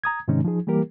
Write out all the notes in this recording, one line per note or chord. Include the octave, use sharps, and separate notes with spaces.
A#5 D#6 G#6
G#2 C3 D#3 G#3 C#4 D#4
F3 D#4 G#4
E3 G3 A#3 G4 A#4